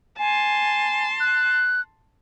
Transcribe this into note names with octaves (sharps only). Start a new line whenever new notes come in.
G#5 A5 C6
F#6